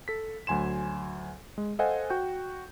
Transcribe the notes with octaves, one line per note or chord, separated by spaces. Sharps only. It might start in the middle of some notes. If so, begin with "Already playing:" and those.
A4 B6
D2 F#3 G#5 C6 E7
G#3
A4 C5 D#5 F5 F#5 G#5
F#4 G5 G6